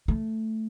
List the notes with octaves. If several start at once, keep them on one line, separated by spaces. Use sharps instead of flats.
A3